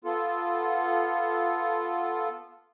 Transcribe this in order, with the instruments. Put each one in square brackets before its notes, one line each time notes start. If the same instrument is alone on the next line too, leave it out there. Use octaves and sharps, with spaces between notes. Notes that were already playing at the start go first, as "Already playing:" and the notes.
[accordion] B3 F4 A4